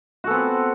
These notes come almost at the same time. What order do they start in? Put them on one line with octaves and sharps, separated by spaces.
F#4 A4 B3 C4